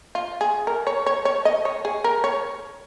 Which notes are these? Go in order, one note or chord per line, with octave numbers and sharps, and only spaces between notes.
F4
G#4
A#4
C#5
C#5
C#5
D#5
C#5
G#4
A#4
C#5